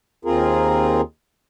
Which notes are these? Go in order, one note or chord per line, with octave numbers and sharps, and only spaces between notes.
D#2 C4 F4 G#4 A#4